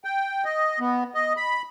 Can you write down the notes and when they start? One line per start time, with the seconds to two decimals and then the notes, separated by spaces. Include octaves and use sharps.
0.04 G5
0.45 D#5
0.80 B3
1.14 D#5
1.37 B5